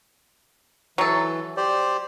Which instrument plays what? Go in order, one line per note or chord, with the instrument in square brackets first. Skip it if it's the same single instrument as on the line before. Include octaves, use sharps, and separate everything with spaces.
[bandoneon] E3 [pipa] F#3 A4
[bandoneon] G4 C5 D5